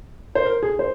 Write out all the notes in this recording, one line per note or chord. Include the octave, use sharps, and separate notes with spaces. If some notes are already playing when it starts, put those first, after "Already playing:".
C5
A#4
G#4
C5